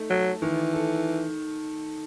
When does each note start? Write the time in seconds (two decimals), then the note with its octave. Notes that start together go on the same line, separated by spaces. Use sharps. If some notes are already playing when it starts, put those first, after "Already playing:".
Already playing: A3 D#4
0.10 F#3 A4
0.42 D#3 E3
0.74 A4